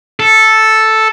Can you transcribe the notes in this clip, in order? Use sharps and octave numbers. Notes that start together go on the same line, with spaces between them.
A4